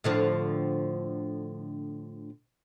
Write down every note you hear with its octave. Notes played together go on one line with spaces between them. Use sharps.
A2 D3 F3